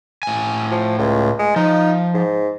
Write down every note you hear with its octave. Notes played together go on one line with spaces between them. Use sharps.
A2 G#5
F3
C#2
G#3
F3 D#4
G#2